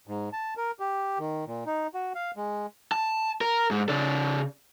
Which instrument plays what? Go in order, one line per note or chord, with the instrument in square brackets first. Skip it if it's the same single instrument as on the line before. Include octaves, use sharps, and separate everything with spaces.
[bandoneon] G#2
A5
A#4
G4
D#3
A#2
D#4
F#4
F5
G#3
[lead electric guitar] A5
A#4
G#2
C#3 D5